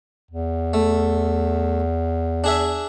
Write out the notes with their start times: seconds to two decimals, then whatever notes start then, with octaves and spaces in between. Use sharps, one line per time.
0.31 E2
0.74 A3
2.44 D4 G#4 E5